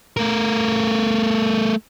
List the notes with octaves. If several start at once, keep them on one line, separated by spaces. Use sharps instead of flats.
A3 A#4